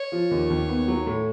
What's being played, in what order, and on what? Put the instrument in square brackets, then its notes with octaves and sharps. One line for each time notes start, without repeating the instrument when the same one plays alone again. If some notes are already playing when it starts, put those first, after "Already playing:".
Already playing: [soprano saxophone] C#5
[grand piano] F3
D#2
D#2
B3
F#3
A2